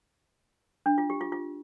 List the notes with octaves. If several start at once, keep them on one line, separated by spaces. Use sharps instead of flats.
D4
F4
G4
F4
F4